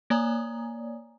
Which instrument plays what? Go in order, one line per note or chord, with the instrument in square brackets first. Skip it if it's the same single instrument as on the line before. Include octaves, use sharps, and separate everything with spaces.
[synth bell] A#3 C#5 D5 G#5 A#5 D#6